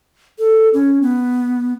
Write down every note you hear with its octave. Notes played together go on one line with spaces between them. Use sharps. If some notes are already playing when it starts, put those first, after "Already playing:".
A4
C#4
B3